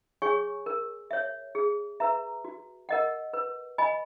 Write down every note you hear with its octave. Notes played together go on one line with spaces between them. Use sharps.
G#4 C#5 G#5 C#6
A#4
C#5 E5
G#4
B4 E5 A#5
F#4
A#4 D#5 F#5
B4
D#5 G#5 B5